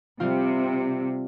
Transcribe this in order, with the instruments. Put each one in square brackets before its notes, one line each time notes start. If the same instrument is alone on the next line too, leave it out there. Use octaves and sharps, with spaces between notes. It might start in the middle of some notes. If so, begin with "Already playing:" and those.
[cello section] C3 [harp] G3 C4 F4